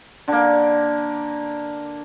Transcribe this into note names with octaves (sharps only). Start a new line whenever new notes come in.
D3 A#3